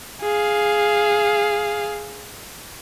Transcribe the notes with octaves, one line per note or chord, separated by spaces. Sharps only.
G#4 F5